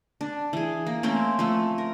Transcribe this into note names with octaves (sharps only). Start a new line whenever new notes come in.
D4
E3 G#4
A#3
A3 A#3 C4 C#4
F3 A3
A#4